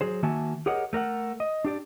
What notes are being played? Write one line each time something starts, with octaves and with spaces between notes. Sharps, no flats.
F#3 G#4 C5
D#3 A#3 F#4 E5 G#5 A5
G4 G#4 A#4 C#5 D#5 F#5
A3 A#4 E5 F#5
D#5
D4 G4 D5